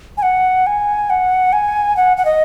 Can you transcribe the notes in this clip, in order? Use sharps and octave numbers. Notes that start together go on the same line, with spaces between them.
G#5
F#5
G#5
F#5
G#5
F#5
F#5
D#5